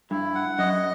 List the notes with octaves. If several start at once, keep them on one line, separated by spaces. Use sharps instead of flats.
G2 E4
F#5
F#2 D#5